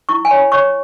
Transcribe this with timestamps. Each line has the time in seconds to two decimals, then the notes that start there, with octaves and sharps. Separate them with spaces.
0.09 E4 C#6
0.25 G#5
0.31 C#5 B5
0.52 C#5 C#6